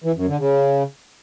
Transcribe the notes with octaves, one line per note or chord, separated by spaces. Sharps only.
E3
F#2
D3
C#3